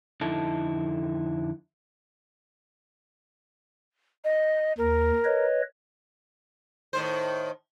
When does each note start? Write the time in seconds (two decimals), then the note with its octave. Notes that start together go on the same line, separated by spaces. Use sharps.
0.21 F2 D3 D#4 E4 A4 A5
4.24 D#5
4.78 D#2 A#4
5.24 B4 C#5 D#5
6.93 A2 D#3 C5